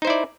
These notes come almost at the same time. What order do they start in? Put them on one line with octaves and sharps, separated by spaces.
D#4 C5 E4 D5